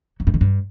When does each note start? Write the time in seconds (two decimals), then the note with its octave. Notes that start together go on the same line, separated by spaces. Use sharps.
0.20 F#3
0.27 G2
0.34 D#3
0.41 G2